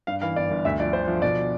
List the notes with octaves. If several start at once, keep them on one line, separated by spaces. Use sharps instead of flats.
G2 F5
E3 F5
G1 D5
G1
D2 E5
F3 D5
D3 C5
F3
B2 D5